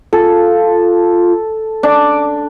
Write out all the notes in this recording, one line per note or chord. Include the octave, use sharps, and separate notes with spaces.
F4 A4
D4 D6